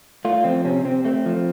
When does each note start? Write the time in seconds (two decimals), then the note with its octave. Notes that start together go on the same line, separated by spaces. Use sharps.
0.25 A3 F4
0.44 F3 C4
0.65 C3 C#4
0.85 C3 C4
1.04 A3 C4
1.26 F3